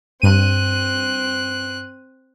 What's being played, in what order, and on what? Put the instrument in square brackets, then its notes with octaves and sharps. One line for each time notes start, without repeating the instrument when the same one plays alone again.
[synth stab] G2 D#7 [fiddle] C4 F#6